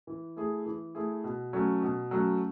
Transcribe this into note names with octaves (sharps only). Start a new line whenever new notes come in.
E3
A3 E4 G#4
E3
A3 E4 G#4
B2
F#3 A3 C#4
B2
F#3 A3 C#4